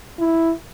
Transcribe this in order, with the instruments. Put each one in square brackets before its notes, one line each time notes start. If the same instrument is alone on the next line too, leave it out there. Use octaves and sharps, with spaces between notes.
[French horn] E4